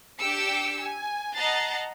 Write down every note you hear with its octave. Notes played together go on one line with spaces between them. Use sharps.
D4 G4 D6 E6 C#7
G#5
D#5 F#5 A5 A#5 A6 C7